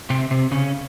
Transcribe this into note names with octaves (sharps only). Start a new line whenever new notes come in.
C3 C4
C3 C4
C#3 C#4